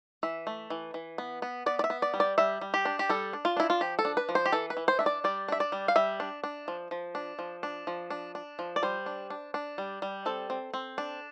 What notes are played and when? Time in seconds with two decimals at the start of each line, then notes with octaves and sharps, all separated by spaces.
0.23 E3 E5
0.47 A3
0.70 E3
0.94 E3
1.18 B3
1.42 B3
1.66 B3 D5
1.79 D5
1.84 E5
1.90 B3
2.02 D5
2.14 G3
2.20 D5
2.38 G3 E5
2.61 G3
2.74 G4
2.85 D4
2.99 G4
3.09 G3 A4
3.33 D4
3.45 F4
3.57 D4 E4
3.70 F4
3.81 F3 G4
3.99 A4
4.05 D4
4.17 B4
4.29 F3
4.35 C5
4.46 G4
4.52 E3 A4
4.70 B4
4.77 E3
4.88 C5
4.99 D4 E5
5.06 D5
5.24 G3 D5
5.48 D4 E5
5.60 D5
5.72 G3
5.88 F5
5.96 G3 E5
6.20 D4
6.44 D4
6.68 F3
6.91 F3
7.15 D4
7.39 F3
7.63 D4
7.87 F3
8.10 D4
8.35 D4
8.59 F3
8.76 D5
8.83 G3 C5
9.06 D4
9.30 D4
9.54 D4
9.78 G3
10.02 G3
10.26 C4 A4
10.50 C4
10.74 C4
10.98 D4